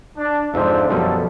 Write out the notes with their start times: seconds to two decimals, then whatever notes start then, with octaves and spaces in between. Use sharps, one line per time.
0.16 D4
0.54 F2 G#2 F3 D4 C5 E5
0.90 F#2 B2 F3 G3 A4